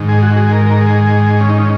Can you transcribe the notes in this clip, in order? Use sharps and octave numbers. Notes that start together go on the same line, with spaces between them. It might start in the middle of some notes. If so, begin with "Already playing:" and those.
Already playing: G#2 D#3
G#4
F#4
G#4
A#4
A#4
G#4
C#4
D#4
C#4